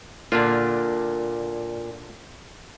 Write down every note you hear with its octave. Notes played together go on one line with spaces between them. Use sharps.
A#2 D3 D4 F4